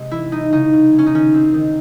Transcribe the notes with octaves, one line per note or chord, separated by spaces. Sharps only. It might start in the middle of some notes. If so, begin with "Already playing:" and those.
Already playing: C3 G#3 C4
E3 E4
G#3 D#4
C#3 D#4
C#3
G#3
C#4
D#4
D#3 C#4
C4
D#3